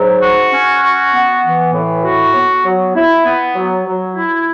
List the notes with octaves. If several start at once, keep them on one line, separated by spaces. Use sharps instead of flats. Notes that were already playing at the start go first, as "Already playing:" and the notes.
Already playing: G#2 F#3
F#4
C#4
F#4
B3
E3
A2
F#4
B3
F#3
E4
B3
F#3
F#3
E4